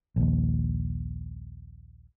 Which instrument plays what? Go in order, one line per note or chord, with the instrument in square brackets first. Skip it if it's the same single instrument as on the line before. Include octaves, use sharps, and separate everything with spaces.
[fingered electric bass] A#1 D#2